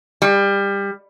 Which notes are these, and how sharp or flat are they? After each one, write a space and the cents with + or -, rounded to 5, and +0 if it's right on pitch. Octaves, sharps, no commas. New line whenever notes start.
G3 +25